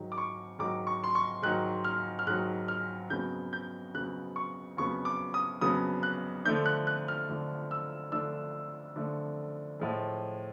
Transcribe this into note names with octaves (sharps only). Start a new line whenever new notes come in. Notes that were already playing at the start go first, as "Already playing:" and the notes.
Already playing: G#2 D#3 F#3
D6
C#6
G#2 D#3 F#3 D6
C#6
C6
C#6
G#2 D#3 F#3 F#6
F6
F6
G#2 D#3 F#3 F#6
F6
F2 C#3 F#3 B3 G6
G6
F2 C#3 F#3 B3 F#6
C#6
F2 C#3 F#3 B3 C#6
D6
D#6
F2 C#3 F#3 B3 D#6
F#6
D3 F3 A3 D4 G6
F#6
F#6
F6
D3 F3 A3 D4
E6
D3 F3 A3 D4 E6
D3 F3 A3 D4
A2 F3 G#3